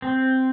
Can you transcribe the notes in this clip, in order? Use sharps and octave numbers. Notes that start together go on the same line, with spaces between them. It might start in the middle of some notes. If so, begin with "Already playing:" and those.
C4